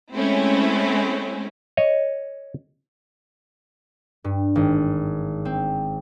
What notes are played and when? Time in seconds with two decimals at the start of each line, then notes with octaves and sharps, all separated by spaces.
0.14 G#3 A3 C4 C#4 E4
1.77 C#5 D#5
4.24 G2
4.55 G#1
5.45 C4